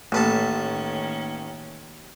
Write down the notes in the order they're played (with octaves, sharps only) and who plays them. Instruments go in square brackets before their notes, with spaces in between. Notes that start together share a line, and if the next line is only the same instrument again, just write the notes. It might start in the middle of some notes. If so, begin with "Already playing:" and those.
[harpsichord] A1 B4 A5 [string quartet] D#3 C#4 [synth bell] A3 A#3 [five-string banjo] A4